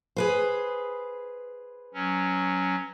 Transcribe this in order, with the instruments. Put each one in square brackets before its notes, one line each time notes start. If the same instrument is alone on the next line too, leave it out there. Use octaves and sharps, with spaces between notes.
[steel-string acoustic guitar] G#4 B4 C5
[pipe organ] F#3 C#4